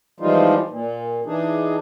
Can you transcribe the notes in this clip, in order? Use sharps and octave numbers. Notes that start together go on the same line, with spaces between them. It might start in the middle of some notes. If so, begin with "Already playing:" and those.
E3 F3 G3 G#3 D#4 F4
A#2
E3 D4 D#4 G#4